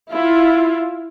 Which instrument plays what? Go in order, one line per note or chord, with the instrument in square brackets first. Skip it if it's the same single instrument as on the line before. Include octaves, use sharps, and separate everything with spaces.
[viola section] E4 F4